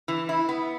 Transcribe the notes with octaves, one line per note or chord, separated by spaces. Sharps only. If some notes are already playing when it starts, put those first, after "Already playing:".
E3
E4
B3